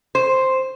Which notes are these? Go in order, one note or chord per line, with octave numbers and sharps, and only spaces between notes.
C5